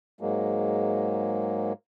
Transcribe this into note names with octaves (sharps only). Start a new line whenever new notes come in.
G#2 F#3 G#3 A#3